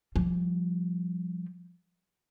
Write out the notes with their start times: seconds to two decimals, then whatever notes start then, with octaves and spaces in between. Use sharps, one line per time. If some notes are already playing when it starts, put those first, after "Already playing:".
0.16 F3 G3